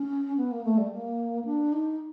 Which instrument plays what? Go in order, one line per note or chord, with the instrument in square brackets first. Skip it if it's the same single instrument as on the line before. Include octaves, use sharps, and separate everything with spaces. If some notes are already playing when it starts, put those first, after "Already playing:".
Already playing: [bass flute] C#4
B3
A#3
A3
G3
A3
A#3
D4
D#4